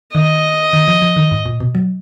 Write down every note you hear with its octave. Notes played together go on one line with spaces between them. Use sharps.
D#3 D#5
D#3
F3
F3
D#3
G#2
A#2
B2
F#3